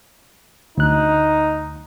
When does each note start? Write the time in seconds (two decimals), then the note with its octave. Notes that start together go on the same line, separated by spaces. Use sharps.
0.77 D2 D#4 F#6